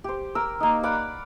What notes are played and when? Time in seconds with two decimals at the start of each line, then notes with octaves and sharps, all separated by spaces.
0.04 G4 C5
0.35 A#4 E6
0.60 A#3 D#4
0.83 D5 F5 F#5 B5